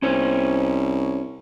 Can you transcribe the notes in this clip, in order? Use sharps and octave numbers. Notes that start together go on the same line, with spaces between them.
C2 C#4 C5 C#5